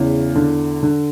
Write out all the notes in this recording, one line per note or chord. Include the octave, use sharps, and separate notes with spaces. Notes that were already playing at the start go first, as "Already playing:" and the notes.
Already playing: E2 C#3
D3
D3